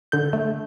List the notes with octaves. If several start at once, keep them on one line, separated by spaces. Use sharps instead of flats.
D3 G6
A3